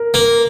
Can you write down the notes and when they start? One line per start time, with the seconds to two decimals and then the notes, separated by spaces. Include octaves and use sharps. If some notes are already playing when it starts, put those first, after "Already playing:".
Already playing: A#4
0.14 A#3